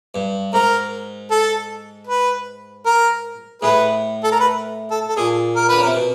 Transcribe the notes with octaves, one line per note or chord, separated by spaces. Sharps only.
G2
G#2 A#4
A4
B4
A#4
A2 G#4 B4
A4
A#4
B4
A4
A4
A#2 G#4
A#4
D3 B4
C#3
A#4
C3
B2